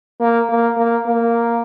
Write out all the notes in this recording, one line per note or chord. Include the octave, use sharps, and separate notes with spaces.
A#3
A#3
A#3
A#3